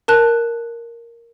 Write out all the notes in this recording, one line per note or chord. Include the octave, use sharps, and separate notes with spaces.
A#4 A5 F#6